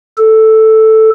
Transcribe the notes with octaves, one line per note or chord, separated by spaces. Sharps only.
A4